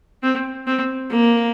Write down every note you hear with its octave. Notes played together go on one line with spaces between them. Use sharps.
C4
C4
A#3